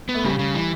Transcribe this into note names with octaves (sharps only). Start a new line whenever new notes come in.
B3
A3
C#3 G3
C#3
E3